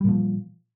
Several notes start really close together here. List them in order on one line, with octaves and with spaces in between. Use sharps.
G3 A#2 F3